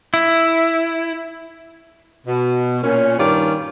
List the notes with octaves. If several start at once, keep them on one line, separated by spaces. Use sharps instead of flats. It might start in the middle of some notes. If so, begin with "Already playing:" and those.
E4
B2
A#2 C#4
G2 D#3 C#4 F4 D5